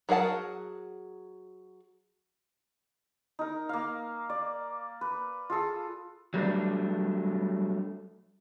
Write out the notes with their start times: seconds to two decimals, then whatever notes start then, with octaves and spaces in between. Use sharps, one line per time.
0.09 F#3 G#4 A#4 F#5 A5
3.39 D#4 A#4
3.69 A#3 F5
4.30 D5
5.01 B4
5.50 F4 G#4 A4
6.34 F#3 G3 A3 D4